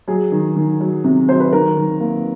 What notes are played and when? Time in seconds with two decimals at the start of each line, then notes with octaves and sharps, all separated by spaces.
0.08 F#3 G#4
0.32 D#3
0.56 D#3
0.80 F#3
1.04 C3
1.29 F#3 C5
1.40 B4
1.53 D#3 A#4
1.77 D#3
2.01 A#3